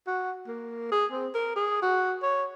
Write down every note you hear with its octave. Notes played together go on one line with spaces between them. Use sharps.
F#4
A#3
G#4
C4
A#4
G#4
F#4
C#5